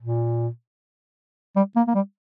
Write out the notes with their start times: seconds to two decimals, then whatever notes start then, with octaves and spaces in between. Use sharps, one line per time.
0.02 A#2
1.56 G3
1.76 A#3
1.88 A#3
1.95 G3